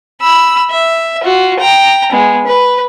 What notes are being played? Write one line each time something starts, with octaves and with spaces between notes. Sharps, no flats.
B5 E6
E5
F4 F#4
G5 A#5
G#3 B3
B4